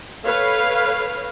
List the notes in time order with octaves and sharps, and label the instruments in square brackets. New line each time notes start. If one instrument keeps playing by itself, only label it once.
[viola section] A4 B4 C#5 F5